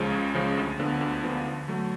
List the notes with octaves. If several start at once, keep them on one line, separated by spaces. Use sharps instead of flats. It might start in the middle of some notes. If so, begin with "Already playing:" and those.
Already playing: C#2 C#3 F3 G#3
C#2
C#3 F3 G#3
D2
D3 F3 B3
D2
D3 F3 B3
D3
F#3 A3